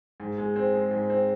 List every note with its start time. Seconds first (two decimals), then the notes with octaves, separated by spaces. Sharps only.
0.20 G#2
0.38 G#3
0.56 C4
0.74 G#3
0.91 G#2
1.10 C4